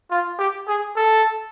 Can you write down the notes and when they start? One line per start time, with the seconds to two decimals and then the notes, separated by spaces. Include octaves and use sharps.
0.11 F4
0.39 G4
0.68 G#4
0.97 A4